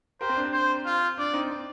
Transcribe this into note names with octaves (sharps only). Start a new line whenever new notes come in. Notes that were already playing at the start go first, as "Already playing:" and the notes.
G4 A#4 C5
C4
D4
C4
C5
F4
D4 D5
C4 D#4
C4